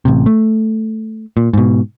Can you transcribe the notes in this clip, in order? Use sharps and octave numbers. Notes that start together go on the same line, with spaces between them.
A1 C3
A3
A#2
G#2 B2